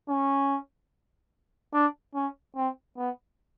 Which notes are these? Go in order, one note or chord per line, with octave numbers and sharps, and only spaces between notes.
C#4
D4
C#4
C4
B3